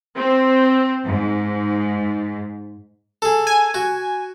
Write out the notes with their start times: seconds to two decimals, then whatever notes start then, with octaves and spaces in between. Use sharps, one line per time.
0.16 C4
1.06 G#2
3.22 G#4 A4
3.47 G#5
3.74 F#4